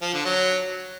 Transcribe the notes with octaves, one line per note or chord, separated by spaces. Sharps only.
F3
D3
F#3